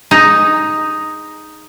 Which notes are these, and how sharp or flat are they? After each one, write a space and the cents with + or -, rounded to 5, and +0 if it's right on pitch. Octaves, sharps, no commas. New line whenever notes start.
D#4 +0 G#4 +0